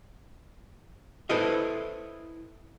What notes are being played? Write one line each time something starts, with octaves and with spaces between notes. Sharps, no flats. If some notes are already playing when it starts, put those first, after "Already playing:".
E4 A4 B4 C5 D#5 E5